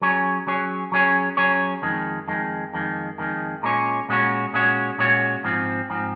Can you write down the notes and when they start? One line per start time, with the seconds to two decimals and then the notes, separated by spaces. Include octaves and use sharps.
0.02 F#3 C#4 G#4 C#5
0.47 F#3 C#4 G#4 C#5
0.92 F#3 C#4 G#4 C#5
1.37 F#3 C#4 G#4 C#5
1.82 F2 D#3 G#3
2.28 F2 D#3 G#3
2.73 F2 D#3 G#3
3.18 F2 D#3 G#3
3.63 A#2 G#3 C#4 F#4 C#5
4.09 A#2 G#3 C#4 F#4 C#5
4.53 A#2 G#3 C#4 F#4 C#5
4.98 A#2 G#3 C#4 F#4 C#5
5.44 G#2 F3 C4
5.90 G#2 F3 C4